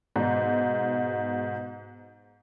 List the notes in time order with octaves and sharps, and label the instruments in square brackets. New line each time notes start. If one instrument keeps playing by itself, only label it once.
[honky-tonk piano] G#2 B2